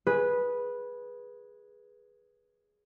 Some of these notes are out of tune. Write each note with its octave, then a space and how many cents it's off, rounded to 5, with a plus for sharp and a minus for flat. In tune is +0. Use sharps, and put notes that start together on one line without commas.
G#4 +0 B4 -10